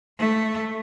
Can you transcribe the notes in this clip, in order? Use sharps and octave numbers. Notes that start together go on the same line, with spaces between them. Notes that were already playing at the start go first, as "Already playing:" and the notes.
A3